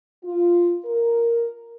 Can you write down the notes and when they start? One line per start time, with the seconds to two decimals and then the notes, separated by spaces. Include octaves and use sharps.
0.25 F4
0.85 A#4